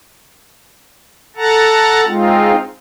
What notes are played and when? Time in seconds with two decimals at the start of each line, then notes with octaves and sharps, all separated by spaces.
1.36 A4 F#5 A5 A#5
2.06 G#3 C4 D#4 F4